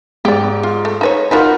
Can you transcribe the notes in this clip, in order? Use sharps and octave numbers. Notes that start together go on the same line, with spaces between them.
G#2 G4 D5
F4
A3
D#4 B4 C#5
D#4 F4 F#4 A#4 B4 F#5